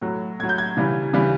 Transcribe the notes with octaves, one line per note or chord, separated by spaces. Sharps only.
A2 F#3
A2 F#3 G#6
G6
G#6
C#3 E3 G3
C#3 E3 G3